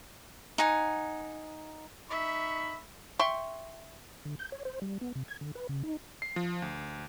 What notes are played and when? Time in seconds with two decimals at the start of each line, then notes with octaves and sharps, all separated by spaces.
0.58 D#4 F#5 G#5
2.10 D#4 E5 B5 C#6
3.19 E5 G5 C6 C#6
4.25 D3
4.39 G6
4.52 C#5
4.65 C5
4.82 G3
5.01 B3
5.15 C3
5.28 G#6
5.41 D3
5.55 B4
5.69 C#3
5.83 D#4
6.22 C7
6.36 F3
6.62 D2